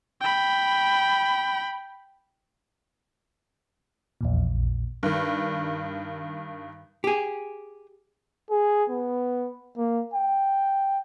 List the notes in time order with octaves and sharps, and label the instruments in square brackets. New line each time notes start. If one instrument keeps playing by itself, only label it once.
[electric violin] G5 B5
[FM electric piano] A#1 E2 A#2
[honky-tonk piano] G2 D#3
[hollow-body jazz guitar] G4 G#4
[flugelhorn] G#4
B3
A#3
G5